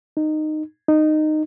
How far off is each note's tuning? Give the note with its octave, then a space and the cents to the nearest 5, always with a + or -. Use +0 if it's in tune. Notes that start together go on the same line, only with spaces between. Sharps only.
D#4 -15
D#4 -15